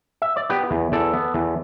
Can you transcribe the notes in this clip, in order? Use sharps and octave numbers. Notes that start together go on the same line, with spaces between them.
E5
D5
B3 G4 B4
E2
E2 A4 D5
B3
E2